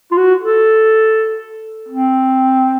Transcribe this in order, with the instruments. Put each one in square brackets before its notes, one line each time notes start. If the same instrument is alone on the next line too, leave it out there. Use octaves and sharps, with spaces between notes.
[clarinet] F4
F#4
A4
C4